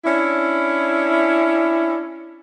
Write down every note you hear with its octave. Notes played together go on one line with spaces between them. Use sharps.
C#4 D4 E4